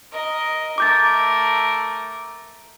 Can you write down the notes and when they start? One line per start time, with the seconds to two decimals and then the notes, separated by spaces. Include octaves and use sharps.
0.12 A#4 D#5
0.78 A3 A#4 D6 G6 A6